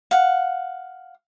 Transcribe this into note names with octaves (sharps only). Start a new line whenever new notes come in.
F5 F#5